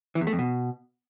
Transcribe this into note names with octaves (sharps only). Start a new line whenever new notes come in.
E3
E2
A3
F2
B2